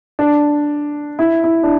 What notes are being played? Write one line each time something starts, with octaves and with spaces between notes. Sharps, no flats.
D4
E4
E4
D4